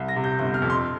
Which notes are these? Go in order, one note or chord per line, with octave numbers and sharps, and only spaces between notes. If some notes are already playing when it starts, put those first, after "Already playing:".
Already playing: C2
A#6
C3
G6
G1 G6
F6
F2
C6